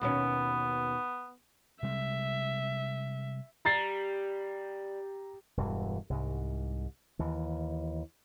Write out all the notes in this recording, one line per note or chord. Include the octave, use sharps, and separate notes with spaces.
D#2 B2 B3 C#4
C3 G3 G#3 E5
G3 A#5 A6 C7
E1 G2 E3
C2 G#2
D#2 E3